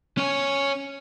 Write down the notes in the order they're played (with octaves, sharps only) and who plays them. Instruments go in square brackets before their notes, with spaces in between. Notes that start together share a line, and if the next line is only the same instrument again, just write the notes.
[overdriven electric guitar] C#4 C#5